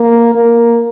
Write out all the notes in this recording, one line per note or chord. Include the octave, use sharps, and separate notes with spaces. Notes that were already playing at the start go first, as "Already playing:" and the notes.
Already playing: A#3
A#3